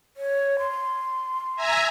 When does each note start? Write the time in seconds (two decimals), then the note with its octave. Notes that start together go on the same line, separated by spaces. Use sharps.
0.17 C#5
0.59 C6
1.56 E5 G#5 A#5